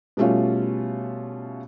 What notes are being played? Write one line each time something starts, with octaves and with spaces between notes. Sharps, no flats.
B2 G3 A3 C#4 F4